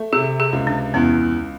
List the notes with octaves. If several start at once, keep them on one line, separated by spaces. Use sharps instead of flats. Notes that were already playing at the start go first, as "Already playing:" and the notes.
Already playing: A3
C3 G#4
G#4
C#2
D4
E2 C#4